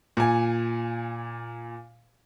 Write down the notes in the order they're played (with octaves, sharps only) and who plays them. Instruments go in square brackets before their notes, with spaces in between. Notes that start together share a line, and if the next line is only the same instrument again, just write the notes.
[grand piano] A#2 G#5